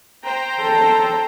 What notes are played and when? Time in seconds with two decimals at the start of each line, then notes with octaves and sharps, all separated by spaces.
0.24 C5 G5 A#5
0.60 A4